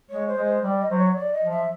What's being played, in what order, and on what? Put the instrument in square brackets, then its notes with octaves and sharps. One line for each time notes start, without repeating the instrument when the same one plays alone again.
[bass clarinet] G#3 [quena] C#5
[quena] C5
[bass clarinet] G#3
[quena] C5
[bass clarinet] G3 [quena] D5
[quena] D#5
[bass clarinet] F#3 [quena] C5
[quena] C#5
D5
D#5
[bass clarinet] F3
[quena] E5